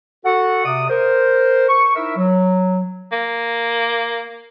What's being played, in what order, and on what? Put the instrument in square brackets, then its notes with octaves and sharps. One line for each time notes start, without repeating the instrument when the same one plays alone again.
[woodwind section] F#4 A4 F#5
C3 D5 D#6
A#4 C5
C#6
D#4 E4 A#4 E5
F#3
[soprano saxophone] A#3